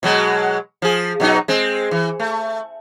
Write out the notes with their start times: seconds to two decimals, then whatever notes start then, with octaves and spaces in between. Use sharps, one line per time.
0.03 B2 F#3 G#3
0.82 F3 G#4
1.20 B2 F#3 D#4
1.48 G#3 C4
1.91 E3
2.20 A3